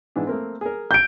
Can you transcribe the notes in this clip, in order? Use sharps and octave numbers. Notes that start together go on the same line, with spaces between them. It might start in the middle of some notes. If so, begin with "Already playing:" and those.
G#2 E3 D4
A3 A#3 C4
G#4 A#4
G6 D7